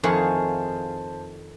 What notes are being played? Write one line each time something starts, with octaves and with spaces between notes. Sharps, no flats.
F2 D#3 E4 G#4 C5 F5 A5 C#6